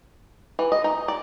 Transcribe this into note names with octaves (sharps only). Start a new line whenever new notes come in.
E3
D#5
D#4
D5